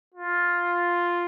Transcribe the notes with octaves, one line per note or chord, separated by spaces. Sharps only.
F4